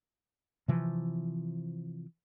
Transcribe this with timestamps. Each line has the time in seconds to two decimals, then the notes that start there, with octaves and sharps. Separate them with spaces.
0.68 C3 E3 F3